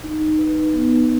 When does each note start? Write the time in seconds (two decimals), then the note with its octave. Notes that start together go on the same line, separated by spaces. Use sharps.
0.04 D#4
0.39 B4
0.73 B3